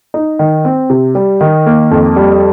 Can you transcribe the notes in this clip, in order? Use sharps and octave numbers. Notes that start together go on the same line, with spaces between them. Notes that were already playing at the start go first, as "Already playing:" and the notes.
D#4
D#3
C4
C3
G3
D#3
A#3
F2
G3